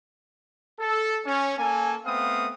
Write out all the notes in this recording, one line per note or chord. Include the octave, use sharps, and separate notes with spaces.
A4
C#4
A#3 A4 G#5
A3 B3 C4 F5 D#6